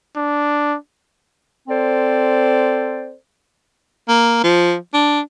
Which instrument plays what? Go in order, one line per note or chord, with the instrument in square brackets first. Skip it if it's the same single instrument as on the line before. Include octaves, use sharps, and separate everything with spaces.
[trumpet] D4
[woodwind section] C4 A4 C5 D5
[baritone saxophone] A#3
F3
D4